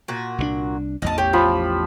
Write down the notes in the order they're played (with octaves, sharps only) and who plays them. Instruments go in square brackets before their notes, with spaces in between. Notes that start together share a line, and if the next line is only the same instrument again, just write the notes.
[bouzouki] A#2 F#4
[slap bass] C2 E3 D4
[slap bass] A1 E2 [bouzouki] D#5 A5
[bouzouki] G4 [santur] C#5
[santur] F3 B5